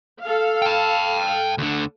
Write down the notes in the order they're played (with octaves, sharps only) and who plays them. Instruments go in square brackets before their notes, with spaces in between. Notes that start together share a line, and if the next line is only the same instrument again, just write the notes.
[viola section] A4 F5
[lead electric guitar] G5 A5
D2 D3